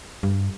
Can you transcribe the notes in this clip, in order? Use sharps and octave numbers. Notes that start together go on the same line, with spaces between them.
G2